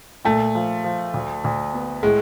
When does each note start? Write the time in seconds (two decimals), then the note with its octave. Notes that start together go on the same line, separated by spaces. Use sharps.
0.25 A#2 A3
0.55 F3
0.84 F3
1.14 D2
1.44 D2
1.73 B3
2.03 A2 G#3